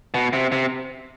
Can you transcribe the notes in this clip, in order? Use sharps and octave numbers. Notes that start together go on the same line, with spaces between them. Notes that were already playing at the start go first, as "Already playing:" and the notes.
B2
C3
C3